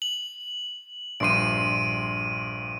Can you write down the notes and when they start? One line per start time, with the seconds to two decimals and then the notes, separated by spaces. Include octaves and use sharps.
0.02 F#7
1.20 A#1 G2 C6 D7 D#7